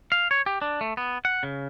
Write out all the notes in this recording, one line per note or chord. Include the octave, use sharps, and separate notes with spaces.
F5
C#5
G4
D4
A3
B3
F#5
C#3